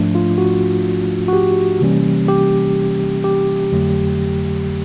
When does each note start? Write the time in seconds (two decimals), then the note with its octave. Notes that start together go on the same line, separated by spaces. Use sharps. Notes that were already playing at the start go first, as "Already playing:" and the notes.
Already playing: G#2 F3 A3 D4
0.15 F4
0.38 F#4
1.28 F#4
1.33 G4
1.81 C3 E3 G3 A#3 C#4
2.28 G4
3.24 G4
3.72 F2 D3 F#3 A3